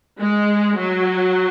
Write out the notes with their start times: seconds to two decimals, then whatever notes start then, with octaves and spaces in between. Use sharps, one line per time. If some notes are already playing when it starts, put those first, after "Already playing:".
0.21 G#3
0.78 F#3